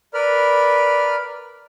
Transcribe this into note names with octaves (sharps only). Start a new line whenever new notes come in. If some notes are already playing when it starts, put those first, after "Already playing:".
A#4 B4 D5 B5 F6